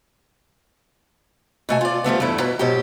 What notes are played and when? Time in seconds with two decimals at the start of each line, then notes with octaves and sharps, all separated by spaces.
1.69 B2 A3 G#5
1.81 F4 D5
2.04 F3 G3 A3 B3
2.20 E2 G2 A3 E4
2.40 B2 B4 A#5
2.59 G#2 B2 F#3 G#3 G4